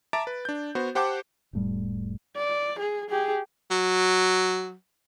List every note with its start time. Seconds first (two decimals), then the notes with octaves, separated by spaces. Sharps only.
0.13 E5 A5 A#5 D6 A6 D7
0.27 B4
0.45 D4 G6
0.75 B3 F#4 C5
0.95 G4 C5 F#5 G5 A5 D6
1.53 F1 A2 G3
2.36 D5
2.79 G#4
3.10 G4 G#4
3.71 F#3